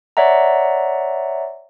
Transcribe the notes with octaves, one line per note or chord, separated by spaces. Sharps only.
C#5 D5 E5 F#5 A#5